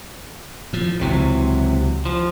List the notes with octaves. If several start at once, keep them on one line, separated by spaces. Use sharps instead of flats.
A2 F3
C#2 C3 E3 F#3
F3